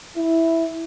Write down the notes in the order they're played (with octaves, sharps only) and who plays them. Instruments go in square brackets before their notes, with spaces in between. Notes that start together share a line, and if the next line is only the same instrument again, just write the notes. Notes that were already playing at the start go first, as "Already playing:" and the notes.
[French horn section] E4